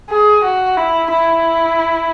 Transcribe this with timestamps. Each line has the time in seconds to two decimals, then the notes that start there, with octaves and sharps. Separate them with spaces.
0.10 G#4
0.44 F#4
0.77 E4
1.11 E4